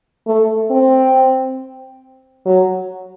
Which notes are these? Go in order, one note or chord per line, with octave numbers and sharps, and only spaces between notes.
A3
C4
F#3